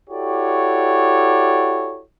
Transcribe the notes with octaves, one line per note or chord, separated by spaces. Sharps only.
E4 F#4 G4 A4 C#5 D5